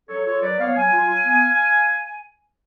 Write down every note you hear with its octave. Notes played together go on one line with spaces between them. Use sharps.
F#3 A4 C#5
F4 A4 C#5
F#3 B4 D5
B3 C#5 F5
F#3 F5 G#5
F4
F#3
B3